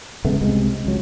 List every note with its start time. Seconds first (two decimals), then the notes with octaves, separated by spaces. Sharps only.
0.25 C#3 G#3 A3 B3
0.41 C2 C3 G#3
0.86 C#2 F#3